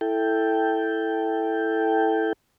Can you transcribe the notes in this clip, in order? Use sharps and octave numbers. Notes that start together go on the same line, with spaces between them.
E4 A4 G5